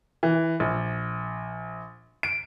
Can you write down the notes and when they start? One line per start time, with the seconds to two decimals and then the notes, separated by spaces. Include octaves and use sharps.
0.23 E3
0.60 A#1
2.23 D7